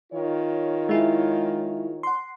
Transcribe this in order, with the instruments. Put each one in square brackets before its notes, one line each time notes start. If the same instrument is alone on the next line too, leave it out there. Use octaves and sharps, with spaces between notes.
[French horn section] D#3 F4 C#5
[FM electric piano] G#3 E4 G#4
F#5 C6